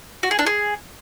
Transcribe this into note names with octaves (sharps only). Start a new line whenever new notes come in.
F#4
G#4
D4
G#4